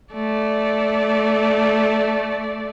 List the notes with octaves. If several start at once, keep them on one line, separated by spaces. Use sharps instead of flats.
A3 D5